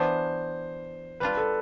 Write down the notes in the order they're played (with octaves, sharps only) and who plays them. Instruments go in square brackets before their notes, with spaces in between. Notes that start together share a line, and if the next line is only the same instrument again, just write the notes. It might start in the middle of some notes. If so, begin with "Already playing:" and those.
Already playing: [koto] E3 B3 D4 [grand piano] C5
[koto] G3 D4 F4 [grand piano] B4
[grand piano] A4